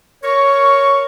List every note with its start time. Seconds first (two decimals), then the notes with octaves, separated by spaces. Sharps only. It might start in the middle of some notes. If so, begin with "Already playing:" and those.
0.24 A#4 C#5 C#6